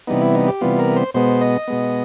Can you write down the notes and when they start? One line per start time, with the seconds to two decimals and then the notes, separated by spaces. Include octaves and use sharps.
0.07 C3 E3 G3 B3 D#4
0.21 E4
0.35 D#4
0.48 G4
0.61 C3 E3 G3 B3 F4
0.79 A#4
0.96 C5
1.14 B2 G#3 B3 C5
1.41 D#5
1.68 B2 G#3 B3